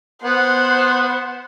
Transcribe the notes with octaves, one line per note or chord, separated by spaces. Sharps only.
B3 C5 F#5